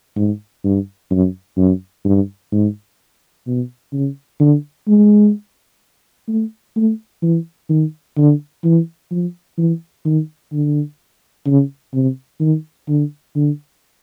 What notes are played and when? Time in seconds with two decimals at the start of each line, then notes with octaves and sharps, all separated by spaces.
0.16 G#2
0.64 G2
1.11 F#2
1.57 F#2
2.05 G2
2.52 G#2
3.47 B2
3.93 C#3
4.40 D3
4.88 G#3
6.28 A3
6.76 A3
7.22 E3
7.69 D#3
8.17 D3
8.64 E3
9.11 F3
9.58 E3
10.05 D#3
10.52 D3
11.46 C#3
11.94 C3
12.40 D#3
12.88 D3
13.35 D3